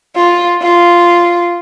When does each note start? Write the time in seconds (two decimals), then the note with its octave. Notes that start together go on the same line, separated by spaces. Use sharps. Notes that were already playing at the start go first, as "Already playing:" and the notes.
0.16 F4
0.62 F4